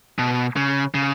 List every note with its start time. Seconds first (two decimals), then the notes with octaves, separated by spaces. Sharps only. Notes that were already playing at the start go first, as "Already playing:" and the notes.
0.19 B2
0.56 C#3
0.95 C#3